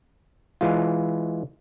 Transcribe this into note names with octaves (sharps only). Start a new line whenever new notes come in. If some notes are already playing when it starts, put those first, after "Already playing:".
E3 G#3 F4